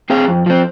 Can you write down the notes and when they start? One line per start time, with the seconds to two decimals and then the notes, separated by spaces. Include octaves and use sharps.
0.10 C4 G#4 F5
0.28 F2
0.46 F3 C4